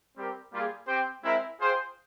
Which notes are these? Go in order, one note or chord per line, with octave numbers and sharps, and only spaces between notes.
G3 C4 G4 A#4
G3 A#3 F4 G#4
C4 G4 C5 G5
G#3 C4 E4 A#4 E5
F4 G#4 C5 G5